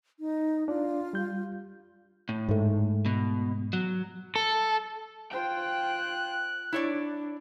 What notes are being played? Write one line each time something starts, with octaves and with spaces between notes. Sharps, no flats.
D#4
D4 F4 D5
G3 G6
A2
G#2 A3
B2
F#3
A4
F4 C5 G5 F#6
D4 E4 C#5 D5